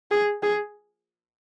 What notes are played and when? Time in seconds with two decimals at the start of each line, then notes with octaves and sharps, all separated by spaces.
0.11 G#4
0.43 G#4